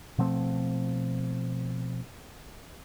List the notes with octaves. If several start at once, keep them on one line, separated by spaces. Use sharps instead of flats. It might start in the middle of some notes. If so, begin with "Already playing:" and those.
B2 F3 A3 C4